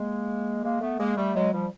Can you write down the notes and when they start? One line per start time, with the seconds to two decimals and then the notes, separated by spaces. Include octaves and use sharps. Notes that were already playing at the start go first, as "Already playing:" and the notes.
Already playing: G#3 A#3
0.63 G#3 A#3
0.81 A3 B3
0.99 G#3 A#3
1.17 G3 A3
1.35 F#3 G#3
1.53 F3 G3